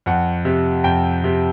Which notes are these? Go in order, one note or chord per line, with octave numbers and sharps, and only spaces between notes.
F2 F#5
C3
F2 G5
C3